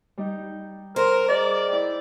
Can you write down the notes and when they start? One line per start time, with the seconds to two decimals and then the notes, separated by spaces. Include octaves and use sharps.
0.18 G3 D#4 G6
0.96 A#4 C5
1.28 G#4 D5 D#5
1.68 E4 G5